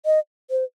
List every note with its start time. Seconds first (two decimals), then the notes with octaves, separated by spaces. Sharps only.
0.06 D#5
0.51 C5